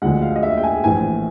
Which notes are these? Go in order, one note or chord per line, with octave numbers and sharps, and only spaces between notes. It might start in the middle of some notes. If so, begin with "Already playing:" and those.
D2 D3 F3 G#3 F#5
F5
D#5
E5
G5
G#5
A#1 A2 E3 G#5